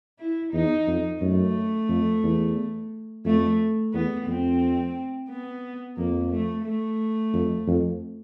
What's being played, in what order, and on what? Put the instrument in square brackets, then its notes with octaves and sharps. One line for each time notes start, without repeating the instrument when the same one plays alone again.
[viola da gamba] E4
[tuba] E2 [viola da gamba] D#4
[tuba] F2
[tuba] F#2 [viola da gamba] A3
[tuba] F2
E2
[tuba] F2 [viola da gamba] A3
[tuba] E2 [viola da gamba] B3
[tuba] F2 [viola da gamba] C4
[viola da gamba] B3
[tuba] F2 [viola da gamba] A#3
[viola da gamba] A3
A3
[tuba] F2
F2